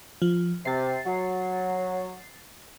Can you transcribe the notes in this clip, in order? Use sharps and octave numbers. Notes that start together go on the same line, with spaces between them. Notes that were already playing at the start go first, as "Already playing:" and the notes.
F3
C3 A6 C7
F#3